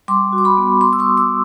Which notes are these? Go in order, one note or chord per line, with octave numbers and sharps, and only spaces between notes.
G3 C6 D6
F#4
D6
B5 C#6
B3
G3 C6 D6
E6
C#6 D#6
F#4
D6 E6